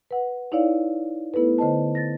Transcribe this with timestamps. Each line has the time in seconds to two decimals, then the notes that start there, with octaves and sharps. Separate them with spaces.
0.11 B4 F#5
0.52 D#4 E4 C#5 D5 F5
1.34 A3 B3 E4 A4 B4
1.58 D3 C5 D#5 A5
1.95 A6 A#6